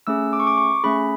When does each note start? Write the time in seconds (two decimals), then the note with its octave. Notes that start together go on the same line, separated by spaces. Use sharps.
0.07 A3 C#4 G#4 E6
0.33 D6
0.40 C#6
0.47 D6
0.58 C#6
0.84 A3 C#4 G#4 B5